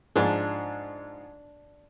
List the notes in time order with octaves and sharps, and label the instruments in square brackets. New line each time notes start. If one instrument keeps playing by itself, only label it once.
[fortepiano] G#2 F3 G#4 [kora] D4